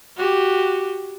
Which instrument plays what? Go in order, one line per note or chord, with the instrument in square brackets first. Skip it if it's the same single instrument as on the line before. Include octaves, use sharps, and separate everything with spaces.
[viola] F#4 G4